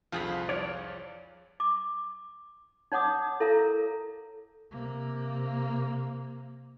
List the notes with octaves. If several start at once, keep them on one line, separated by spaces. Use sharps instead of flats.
C2 F2 F3 F4 G#4 B5
C#5 D5
D6
D#4 C#5 F#5 D6 D#6
E4 A4 A#4 C#5 F5 A#5
C3 A#3